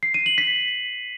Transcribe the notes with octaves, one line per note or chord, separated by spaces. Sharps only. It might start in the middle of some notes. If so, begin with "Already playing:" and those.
C7
D#7
F#7
B6